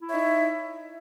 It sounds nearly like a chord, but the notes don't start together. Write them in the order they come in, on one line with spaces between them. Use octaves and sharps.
E4 C#5 E5 D#4